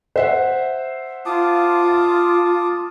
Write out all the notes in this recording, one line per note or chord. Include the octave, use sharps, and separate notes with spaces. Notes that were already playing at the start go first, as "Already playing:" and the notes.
C5 E5 F#5
F4 A5 D6 D#6